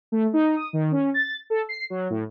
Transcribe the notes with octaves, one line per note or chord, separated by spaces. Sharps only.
A3
D#4
D#6
D#3
C#4
A6
A4
C7
F#3
A2